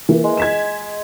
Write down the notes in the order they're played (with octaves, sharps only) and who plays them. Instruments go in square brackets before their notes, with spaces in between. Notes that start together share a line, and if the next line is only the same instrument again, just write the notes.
[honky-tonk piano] E3 A#3
[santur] G#3
[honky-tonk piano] G#6 B6 E7